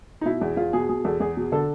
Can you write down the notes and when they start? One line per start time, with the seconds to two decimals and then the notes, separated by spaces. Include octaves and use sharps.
0.21 D#4
0.25 B2 E4
0.41 E2
0.57 E2 F4
0.73 B2 G#4
0.89 B2 G#4
1.04 E2 A4
1.20 E2 G#4
1.37 B2
1.52 D3 A4